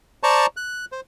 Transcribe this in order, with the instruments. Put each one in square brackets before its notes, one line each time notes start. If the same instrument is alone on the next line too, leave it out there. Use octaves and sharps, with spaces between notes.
[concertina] C5 D5 A5 A#5 C#6
F#6
C5